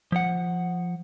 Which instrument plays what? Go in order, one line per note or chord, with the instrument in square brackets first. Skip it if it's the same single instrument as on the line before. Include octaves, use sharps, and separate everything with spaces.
[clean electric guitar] F3 F#5